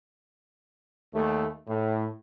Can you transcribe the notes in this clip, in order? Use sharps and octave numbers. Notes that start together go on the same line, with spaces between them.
D#2 A3
A2